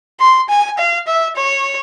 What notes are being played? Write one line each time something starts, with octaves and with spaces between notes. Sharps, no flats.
C6
G#5
F5
E5
C#5